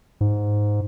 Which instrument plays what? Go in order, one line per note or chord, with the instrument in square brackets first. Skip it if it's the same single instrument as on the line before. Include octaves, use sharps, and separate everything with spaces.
[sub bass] G#2